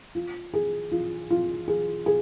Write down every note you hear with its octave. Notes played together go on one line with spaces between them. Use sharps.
F4
G#4
F4
F4
G#4
G#4